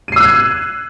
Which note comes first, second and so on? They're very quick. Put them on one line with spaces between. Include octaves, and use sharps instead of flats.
D#7 C7 E6 F#6 G#6